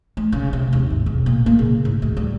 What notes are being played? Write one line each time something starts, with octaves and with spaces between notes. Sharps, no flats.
A3
C#3
C3
D#2
G#1
E1
A#2
A#3
C#3
A2
D2
G3